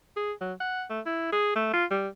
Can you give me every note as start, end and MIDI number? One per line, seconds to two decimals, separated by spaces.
0.16 0.33 68
0.41 0.53 54
0.60 0.85 78
0.90 1.01 57
1.06 1.29 64
1.32 1.52 68
1.55 1.70 57
1.73 1.85 65
1.91 2.08 55